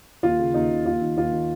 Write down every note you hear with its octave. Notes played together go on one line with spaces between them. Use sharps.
D#2 F4
C#3
D#2 D#4
C#3
D#2 F4
D#3
D#2 F4
D#3